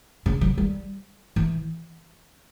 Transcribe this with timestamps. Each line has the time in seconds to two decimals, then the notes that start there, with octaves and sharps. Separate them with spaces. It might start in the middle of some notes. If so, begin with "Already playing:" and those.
0.26 C#3
0.41 F#3
0.58 G3
1.36 E3